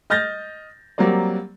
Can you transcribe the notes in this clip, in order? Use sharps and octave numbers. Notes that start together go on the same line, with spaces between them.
D#5 F6 G6 A6 A#6
F#3 G3 A#3 C4 D5